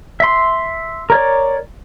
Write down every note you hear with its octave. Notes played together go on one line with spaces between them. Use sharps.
E5 C6
A#4 C#5 D5